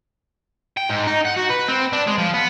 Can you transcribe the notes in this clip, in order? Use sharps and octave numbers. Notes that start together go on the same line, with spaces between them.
G5
G#2
D#4
F#5
F#4
B4
C4
D4
G#3
F3
B3